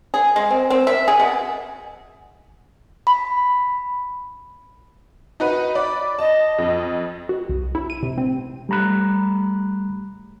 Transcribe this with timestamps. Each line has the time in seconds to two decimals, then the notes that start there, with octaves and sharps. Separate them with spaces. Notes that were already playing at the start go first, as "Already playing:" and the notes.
0.14 G#4
0.36 G#3
0.50 C4
0.70 C4
0.87 E5
1.08 G#4
1.20 B2
3.07 B5
5.40 D#4 F#4 B4
5.75 D5 B5
6.19 D#5 A5
6.58 F2
7.29 F#4
7.49 C2
7.75 E4
7.90 D#7
8.03 C3
8.18 C4
8.69 G3 A3 A#5 B5 F#6